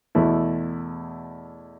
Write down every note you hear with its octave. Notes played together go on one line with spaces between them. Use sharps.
E2 B2 A3 E4